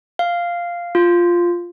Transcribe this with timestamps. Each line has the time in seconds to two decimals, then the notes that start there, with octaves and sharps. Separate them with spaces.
0.19 F5
0.95 F4